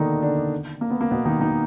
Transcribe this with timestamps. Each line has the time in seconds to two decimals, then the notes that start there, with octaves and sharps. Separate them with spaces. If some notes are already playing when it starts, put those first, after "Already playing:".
Already playing: B2 D3 D#3 A#3 B3 D4 D#4
0.23 D3 D4
0.81 A#3
0.90 B3
1.01 A#3
1.11 B2 B3
1.26 D#3 D#4
1.41 D#3 D#4